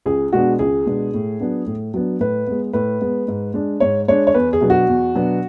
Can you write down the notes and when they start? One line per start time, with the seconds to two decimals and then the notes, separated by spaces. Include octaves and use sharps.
0.06 C#2 G#4
0.33 B2 G#3 B3 D4 F#4
0.59 C#2 G#4
0.86 B2 G#3 B3 D4
1.14 A2
1.40 F#3 B3 D4
1.67 A2
1.94 F#3 B3 D4
2.20 A2 B4
2.47 G#3 B3
2.73 A2 B4
3.01 G#3 B3
3.28 G#2
3.54 G#3 D4
3.80 G#2 C#5
4.08 G#3 D4 C#5
4.27 C#5
4.34 E2 B4
4.53 G#4
4.61 B2 F#3 B3 D4
4.70 F#4
4.88 E2
5.15 B2 F#3 B3 D4